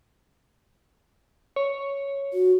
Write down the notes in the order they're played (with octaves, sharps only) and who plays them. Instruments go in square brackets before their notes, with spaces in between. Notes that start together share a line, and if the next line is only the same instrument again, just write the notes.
[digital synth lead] C#5
[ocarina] F#4